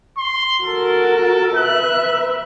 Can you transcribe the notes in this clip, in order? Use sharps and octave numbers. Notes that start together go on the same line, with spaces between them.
C6
F#4 A4 A#4
B4 E5 F#6